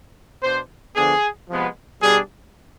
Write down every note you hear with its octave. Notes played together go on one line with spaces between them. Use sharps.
B2 B3 D4 C5
D3 F3 B3 D4 G#4
C3 F3 G#3 B3
B2 G3 D4 G#4